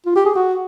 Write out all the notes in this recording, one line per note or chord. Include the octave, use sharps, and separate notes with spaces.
F4
G4
G#4
F#4